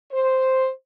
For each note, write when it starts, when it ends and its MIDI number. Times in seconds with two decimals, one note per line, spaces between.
0.12 0.68 72